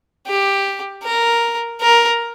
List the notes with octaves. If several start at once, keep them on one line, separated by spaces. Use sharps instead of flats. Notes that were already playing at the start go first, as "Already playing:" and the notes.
G4
A#4
A#4